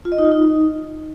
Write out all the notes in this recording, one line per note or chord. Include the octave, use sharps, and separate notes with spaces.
F4
D#5
D#4
F4
D#4